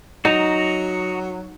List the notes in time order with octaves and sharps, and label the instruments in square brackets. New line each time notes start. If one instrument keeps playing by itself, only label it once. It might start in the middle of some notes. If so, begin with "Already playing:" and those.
[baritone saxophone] F#3 [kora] D#4 [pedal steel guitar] F#4 D#5 A#5